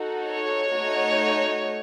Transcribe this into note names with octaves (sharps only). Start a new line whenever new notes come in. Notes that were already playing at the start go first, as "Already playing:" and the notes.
Already playing: D#4 F#4 A4
C#5
A3 D#4 F#4